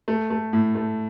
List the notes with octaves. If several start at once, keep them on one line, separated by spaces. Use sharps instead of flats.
A3
A3
A2
A3